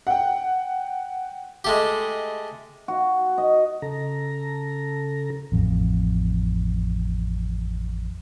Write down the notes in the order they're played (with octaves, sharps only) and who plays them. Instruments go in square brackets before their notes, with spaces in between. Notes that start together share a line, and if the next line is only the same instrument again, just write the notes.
[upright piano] F#5 G5
[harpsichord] G#3 A3 G4
[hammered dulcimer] F#4
D#5
[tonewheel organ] C#3 A4 A#5
[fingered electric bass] A1 F2